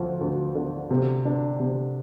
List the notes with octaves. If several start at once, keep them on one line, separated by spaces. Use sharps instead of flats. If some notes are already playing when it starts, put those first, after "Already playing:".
Already playing: D2 F3
D2
D3
C3
D4
C3